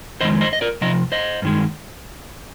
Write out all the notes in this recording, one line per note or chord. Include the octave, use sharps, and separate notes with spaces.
F2 D#3 G#3 C5 D#5
C5 D#5
D#5
A#4 D5
C3 F3 D#5
C5 D#5
G2 D#3 G#3